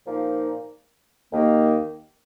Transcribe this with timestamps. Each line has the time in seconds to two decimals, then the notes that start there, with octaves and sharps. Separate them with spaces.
0.05 A#2 F3 A#3 D#4
1.30 D#2 D#3 A#3